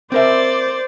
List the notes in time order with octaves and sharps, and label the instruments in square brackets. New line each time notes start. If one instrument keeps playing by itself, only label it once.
[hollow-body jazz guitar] C4 A#4 E5 [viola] C5 D5